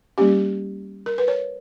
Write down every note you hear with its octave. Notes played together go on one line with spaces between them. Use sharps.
G3 A#3 C#4 G4
A#4
B4
C#5